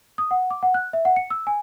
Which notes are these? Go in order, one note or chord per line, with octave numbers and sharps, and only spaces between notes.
D#6
F#5
D6
F#5
F#6
E5
F#5
C#7
E6
G#5